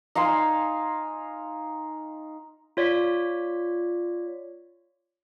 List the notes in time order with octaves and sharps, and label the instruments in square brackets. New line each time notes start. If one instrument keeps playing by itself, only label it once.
[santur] D#4 F5 G#5 C6
[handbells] F4 C#5 D5 B6